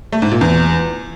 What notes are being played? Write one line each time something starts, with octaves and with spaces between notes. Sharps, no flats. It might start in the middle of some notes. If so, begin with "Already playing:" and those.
A3
G#2
A#2
E2